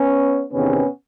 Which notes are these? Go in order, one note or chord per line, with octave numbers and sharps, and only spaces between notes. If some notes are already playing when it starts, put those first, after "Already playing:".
Already playing: B3 C#4
E2 C3 D#3 B3 C#4